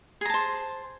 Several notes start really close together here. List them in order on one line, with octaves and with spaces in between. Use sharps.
G#4 A#5 A5 C5